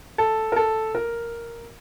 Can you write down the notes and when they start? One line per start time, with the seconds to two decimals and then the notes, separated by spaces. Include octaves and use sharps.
0.18 A4
0.52 A#4
0.56 A4
0.95 A#4